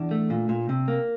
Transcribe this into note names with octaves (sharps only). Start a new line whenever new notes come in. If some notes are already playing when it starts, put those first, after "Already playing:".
Already playing: E2 D4
A3
A#2
A#2
C3
A#3